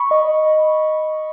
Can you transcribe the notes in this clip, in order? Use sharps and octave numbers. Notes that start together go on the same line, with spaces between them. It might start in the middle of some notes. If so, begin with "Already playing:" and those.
Already playing: B5 C#6
D#5